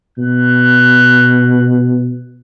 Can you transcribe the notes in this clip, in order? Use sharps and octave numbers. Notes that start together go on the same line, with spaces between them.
B2 F#6